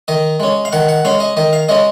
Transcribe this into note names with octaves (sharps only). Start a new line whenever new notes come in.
D#3 D#5
G#3 C#4
F5
D#3 F#5
F#5
G#3 C#4 F5
D#5
D#3 D#5
F5
G#3 C#4 D#5